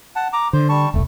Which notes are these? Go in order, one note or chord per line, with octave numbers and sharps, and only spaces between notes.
F#5 A5
A#5 D6
D3 C5
G3 A5 C#6
E1 C2 A3